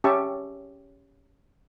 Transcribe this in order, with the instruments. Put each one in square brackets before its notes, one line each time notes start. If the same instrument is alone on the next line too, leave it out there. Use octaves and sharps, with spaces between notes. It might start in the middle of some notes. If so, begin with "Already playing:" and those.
[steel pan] C#4 G4 E5 A5 C#6